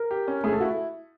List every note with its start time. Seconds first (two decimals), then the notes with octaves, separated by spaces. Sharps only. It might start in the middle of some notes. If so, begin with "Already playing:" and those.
Already playing: A#4
0.11 G4
0.28 C#4
0.44 A3 G#4
0.53 A4
0.60 E4 F#4